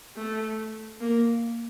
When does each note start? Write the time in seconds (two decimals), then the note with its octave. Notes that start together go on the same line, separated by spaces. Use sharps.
0.16 A3
1.01 A#3